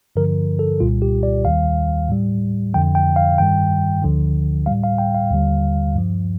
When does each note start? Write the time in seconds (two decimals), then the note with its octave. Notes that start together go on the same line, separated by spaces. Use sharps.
0.16 G2 D3 F3 A#4
0.59 A4
0.80 C2 A#2 G3 F4
1.02 G4
1.23 D5
1.45 D#2 D#3 G3 F5
2.09 A2 G3
2.74 F2 D3 F3 G5
2.95 G5
3.16 F5
3.38 G2 D#3 G3 G5
4.02 D2 D3 F3
4.66 A2 G3 F5
4.84 F5
4.98 G5
5.15 F5
5.31 D#2 D3 G3
5.95 G2 F3